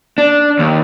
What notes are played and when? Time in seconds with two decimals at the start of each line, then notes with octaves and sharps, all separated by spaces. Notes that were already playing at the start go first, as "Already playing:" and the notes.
0.18 D4
0.59 D#2